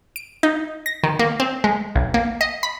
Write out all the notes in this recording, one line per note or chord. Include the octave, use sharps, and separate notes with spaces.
D7
D#4
A#6
D#3
A#3
C4
G#3
B1
A#3
D#5
B5